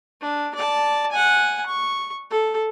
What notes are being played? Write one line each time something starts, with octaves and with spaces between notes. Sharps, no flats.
D4
D5 A5
F#5 G#5
C#6
A4